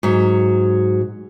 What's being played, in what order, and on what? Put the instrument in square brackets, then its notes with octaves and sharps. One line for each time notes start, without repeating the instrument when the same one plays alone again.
[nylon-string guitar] G#2 F#3